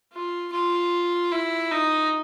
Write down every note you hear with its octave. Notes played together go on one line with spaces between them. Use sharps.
F4
F4
E4
D#4